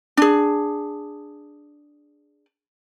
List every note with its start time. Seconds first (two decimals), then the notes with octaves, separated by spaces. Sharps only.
0.17 D4 G#4